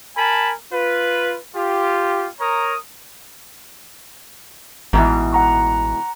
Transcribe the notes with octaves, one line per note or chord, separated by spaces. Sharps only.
A#4 G#5 A5 B5
F4 B4
F4 G4
A#4 C#5 A#5 D#6
A1 G#2 B2 E3
F#5 A#5 C#6